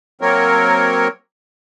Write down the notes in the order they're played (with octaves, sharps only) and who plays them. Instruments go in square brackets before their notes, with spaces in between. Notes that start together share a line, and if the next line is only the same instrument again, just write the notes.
[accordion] F#3 A#3 C4 A#4 C#5